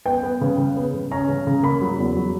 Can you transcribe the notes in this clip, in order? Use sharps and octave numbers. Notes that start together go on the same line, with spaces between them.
B3 G5
B3
C#3
C#3
B3
C#3
C#4 A#5
C#3
C#3
A#3 B5
F#3
E2
F#3